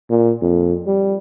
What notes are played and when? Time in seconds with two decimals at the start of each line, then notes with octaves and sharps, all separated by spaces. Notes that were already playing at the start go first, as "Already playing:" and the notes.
0.10 A#2
0.42 F2
0.87 G3